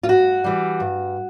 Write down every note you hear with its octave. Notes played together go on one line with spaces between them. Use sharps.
F4
G2 F#4
E3 G3
G2